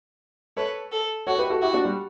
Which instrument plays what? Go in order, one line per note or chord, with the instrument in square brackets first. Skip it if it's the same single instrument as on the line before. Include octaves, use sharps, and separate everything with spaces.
[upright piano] A4 C#5 [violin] B4
[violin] A4
[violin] F#4 [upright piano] A4 C#5
[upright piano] G4 B4
F#4 A4
[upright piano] E4 G4 [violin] F#4
[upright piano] D4 F#4
G3